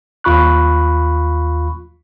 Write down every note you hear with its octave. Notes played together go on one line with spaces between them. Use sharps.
D#2 F4 B5 C#6 F#6